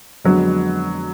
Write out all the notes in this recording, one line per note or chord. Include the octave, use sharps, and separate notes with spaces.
F2 D3 F#3 G#3 B3 D4